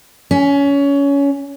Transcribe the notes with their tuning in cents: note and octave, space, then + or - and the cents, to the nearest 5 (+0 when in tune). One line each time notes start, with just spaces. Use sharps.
C#4 +20